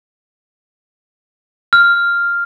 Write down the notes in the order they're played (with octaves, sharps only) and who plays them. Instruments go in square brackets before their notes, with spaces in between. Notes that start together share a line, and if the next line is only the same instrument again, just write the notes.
[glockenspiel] F6